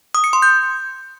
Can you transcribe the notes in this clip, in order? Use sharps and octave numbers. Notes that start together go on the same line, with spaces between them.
D#6
C#7
C6
G6